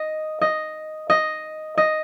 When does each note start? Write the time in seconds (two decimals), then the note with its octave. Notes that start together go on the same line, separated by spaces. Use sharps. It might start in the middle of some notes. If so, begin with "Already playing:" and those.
Already playing: D#5
0.41 D#5
1.10 D#5
1.78 D#5